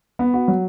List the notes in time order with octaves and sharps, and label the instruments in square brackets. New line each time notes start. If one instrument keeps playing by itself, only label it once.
[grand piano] B3
F#4
F#3